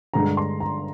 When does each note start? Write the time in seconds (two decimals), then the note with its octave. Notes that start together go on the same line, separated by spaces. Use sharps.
0.14 G2 D3 G#3 D4 A#5
0.37 C6
0.60 A#5